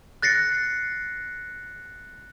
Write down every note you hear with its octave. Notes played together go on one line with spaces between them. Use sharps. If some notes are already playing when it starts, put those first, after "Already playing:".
F#6 A6 A#6 C7 C#7